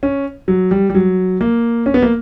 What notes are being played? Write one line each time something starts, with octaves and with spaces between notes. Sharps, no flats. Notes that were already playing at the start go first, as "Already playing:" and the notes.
C#4
F#3
G3
G3
F#3
A#3
C#4
B3
A#3